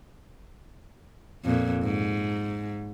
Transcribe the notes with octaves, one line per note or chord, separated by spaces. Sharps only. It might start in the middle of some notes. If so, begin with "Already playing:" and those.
F2 A#2
G#2